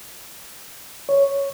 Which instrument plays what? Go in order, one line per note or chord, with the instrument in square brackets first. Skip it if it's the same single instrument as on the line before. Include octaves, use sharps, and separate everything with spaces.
[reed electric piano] C#5